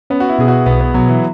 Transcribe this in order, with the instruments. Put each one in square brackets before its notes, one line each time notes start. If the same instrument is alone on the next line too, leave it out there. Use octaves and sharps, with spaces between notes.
[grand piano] B3 [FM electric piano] C#4
[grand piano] F#4
E4
[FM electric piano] B2 [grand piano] G#4
[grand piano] F#4
[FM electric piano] B1 [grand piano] B3
[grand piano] B3
[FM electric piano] B2 [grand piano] F#3
[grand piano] E3